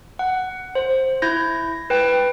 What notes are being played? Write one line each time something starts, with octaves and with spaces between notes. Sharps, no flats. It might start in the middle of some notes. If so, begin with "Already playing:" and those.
F#5
C5
E4 G6 G#6 A#6
B4 G5